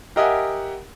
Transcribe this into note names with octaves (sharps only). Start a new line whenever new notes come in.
G4 A#4 D#5 E5 F#5 G#5